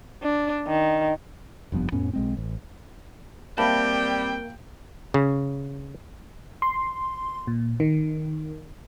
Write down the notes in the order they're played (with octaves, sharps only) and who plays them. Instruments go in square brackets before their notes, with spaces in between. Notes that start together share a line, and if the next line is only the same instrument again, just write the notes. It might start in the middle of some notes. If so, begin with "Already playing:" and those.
[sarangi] D4
D#3
[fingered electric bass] F1 G2 F3 B3
F2 A2 B3 C#4
B1 G#3 C4
A1
[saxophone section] G3 C4 [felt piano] A#3 F5 [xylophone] E5 A5 B5 [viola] G5
[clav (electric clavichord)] C#3
[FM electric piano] C6
A#2
D#3